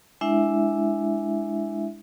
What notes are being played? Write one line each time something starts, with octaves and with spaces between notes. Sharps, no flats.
G#3 D4 E4 E5